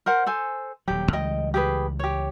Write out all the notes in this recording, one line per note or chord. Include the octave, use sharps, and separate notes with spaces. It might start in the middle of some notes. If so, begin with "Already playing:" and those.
A#4 C5 F#5
A4 C5 G#5
D#1 F#3 G4
C#2 E3 G3 D#5 G5
G4 G#4 B4
G4 C#5